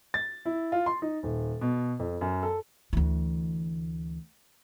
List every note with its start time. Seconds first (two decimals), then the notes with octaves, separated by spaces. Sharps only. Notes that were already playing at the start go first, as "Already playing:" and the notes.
0.14 A6
0.45 E4
0.72 F4
0.86 C6
1.02 D#4
1.23 D#1
1.61 B2
1.99 F2
2.21 F#2
2.43 A4
2.93 D2 E3